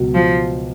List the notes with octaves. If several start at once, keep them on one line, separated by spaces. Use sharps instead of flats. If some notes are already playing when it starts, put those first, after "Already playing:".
Already playing: C#2 B2 F#3
F3